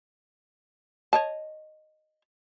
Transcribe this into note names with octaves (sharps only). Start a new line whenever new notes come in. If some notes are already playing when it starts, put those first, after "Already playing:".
C#5 D#5 A5